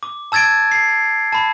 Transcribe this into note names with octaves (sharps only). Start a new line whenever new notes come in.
D6
A5 E6 G#6 A6 D7
C7
A5 B5